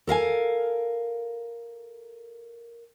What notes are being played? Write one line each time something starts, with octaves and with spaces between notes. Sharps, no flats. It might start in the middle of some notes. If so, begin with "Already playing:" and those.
A4 A#4 F5 G#5